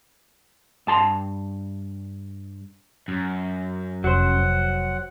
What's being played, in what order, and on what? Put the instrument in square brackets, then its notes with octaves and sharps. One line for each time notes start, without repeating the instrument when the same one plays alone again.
[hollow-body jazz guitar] G2 A5 C6
[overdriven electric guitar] F#2
[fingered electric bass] F1 [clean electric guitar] F#3 C5 [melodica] F#5